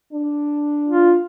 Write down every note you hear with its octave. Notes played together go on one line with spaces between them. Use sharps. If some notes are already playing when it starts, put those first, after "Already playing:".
D4
F4